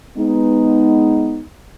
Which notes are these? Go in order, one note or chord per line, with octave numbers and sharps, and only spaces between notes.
G#3 B3 D#4